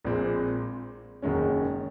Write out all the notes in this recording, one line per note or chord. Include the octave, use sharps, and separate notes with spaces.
A#1 A#2 G#3 C4
F#1 F#2 D#3 G#3 C#4